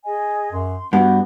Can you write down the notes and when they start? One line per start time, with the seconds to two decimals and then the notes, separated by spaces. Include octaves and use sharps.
0.05 G#4 D#5 G#5
0.52 F#2 C6
0.93 G2 B3 F#4 G4